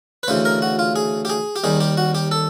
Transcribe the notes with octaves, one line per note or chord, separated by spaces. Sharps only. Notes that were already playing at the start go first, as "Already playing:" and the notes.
B4
D2 C#3 E3 C5
A#4
F#4
F4
G#4
G4
G#4
G4
D#2 D#3 G3 G#4
G4
F#4
G4
A4